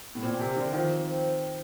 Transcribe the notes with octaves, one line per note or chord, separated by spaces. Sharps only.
A2
A#2 C4
C3 A#4
D3 G4
D#3 F3
C4